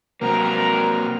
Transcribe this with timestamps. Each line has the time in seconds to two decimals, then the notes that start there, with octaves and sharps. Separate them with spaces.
0.21 G2 C3 F#3 A#3 C4 A#4 A#5 F6